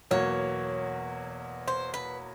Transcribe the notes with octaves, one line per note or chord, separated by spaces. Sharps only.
E2 B2 F#3 A#3 C#5
C5
B4